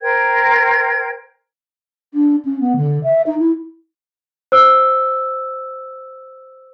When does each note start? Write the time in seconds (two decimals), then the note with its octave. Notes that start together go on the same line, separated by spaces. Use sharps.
0.01 A#4 C5 G5 G#6
2.13 D4
2.44 C#4
2.60 B3
2.76 D3
3.03 E5
3.26 D#4
3.39 E4
4.52 C5 E6